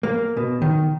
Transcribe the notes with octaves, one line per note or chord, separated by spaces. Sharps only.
A#3
B2
D#3